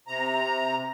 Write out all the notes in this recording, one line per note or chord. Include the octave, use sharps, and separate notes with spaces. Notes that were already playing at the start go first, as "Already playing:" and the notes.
C3 A#5